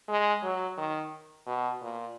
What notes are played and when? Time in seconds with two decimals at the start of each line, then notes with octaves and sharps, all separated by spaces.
0.09 G#3
0.43 F#3
0.78 D#3
1.47 B2
1.82 A#2